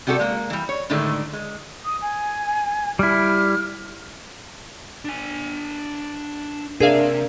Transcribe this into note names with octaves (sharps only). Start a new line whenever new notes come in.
C3 G3 F#4 G4 A4
G#3 A#3
E3 G3
C#5
A2 D3 D#3 G#3 A3
G#3
D#6
G#5
G3 E4 F6
D4 G#5
C3 D4 G#4 A#4 E5 F5